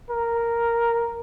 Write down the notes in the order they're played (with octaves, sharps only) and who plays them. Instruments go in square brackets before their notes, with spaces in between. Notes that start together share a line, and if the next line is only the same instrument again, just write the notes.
[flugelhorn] A#4